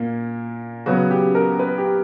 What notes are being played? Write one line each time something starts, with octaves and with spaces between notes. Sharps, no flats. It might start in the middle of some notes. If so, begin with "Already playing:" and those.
Already playing: A#2 A#3
C#3 F#3 B3 F#4
G4
A#4
B4
G4